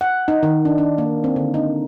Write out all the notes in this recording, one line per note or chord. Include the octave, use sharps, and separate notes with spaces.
F#5
D#4
D#3
D4
D4
A#3
C4
D3
D#4